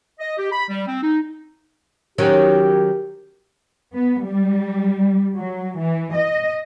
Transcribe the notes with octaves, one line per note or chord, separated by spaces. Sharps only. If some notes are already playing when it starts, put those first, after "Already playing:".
D#5
G4
B5
G3
C4
D#4
D#3 F#3 C#4 G4
B3
G3
F#3
E3
D#5